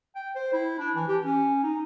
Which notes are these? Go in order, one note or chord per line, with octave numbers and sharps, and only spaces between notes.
G5
C5
E4
D4
E3
G4
C#4
D#4